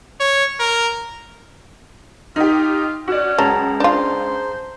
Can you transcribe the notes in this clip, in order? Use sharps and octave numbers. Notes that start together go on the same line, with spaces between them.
C#5
A#4
D#4 F4 G4
C#4 F#4 D5
C#2 F#3 G#4 A5 A#5
D4 F4 C5